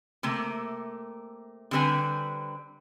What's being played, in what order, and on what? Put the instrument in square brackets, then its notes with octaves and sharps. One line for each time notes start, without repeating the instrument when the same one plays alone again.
[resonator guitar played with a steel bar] C3 A3 A#3
D3 G3 C4 B4 G#5